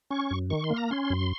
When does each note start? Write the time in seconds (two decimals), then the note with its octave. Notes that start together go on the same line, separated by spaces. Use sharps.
0.11 C#4 C#6
0.31 F#2
0.50 D#3 C#6
0.64 C6
0.70 A#3
0.77 A#5
0.91 C#4 C6
1.10 F#2